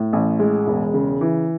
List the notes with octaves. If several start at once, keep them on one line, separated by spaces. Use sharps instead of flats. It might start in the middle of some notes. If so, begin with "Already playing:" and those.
Already playing: A2
A1
G#3
E1
C#3
E3